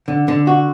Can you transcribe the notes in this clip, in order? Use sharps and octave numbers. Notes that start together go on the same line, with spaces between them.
D3
D3
F#4